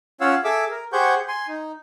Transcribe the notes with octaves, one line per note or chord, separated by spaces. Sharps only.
C#4 F4 C#5 F5 F#5 E6
G#4 A4 E5 D6 E6
A#4
G4 G#4 C5 F#5 C#6 G6
G#5 C6
D#4